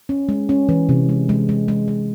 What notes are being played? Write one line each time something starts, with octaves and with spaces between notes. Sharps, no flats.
C#4
G#3
C#4
E3
C3
G#3
G#3
G#3
G#3
G#3